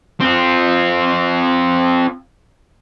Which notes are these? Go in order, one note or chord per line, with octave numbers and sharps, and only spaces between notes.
C4 F4